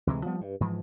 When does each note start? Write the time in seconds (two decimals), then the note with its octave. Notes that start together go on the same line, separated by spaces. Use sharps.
0.07 D2 C3 E3 G#3
0.25 F3 G3 B3
0.41 G2
0.60 G#2 E3 F3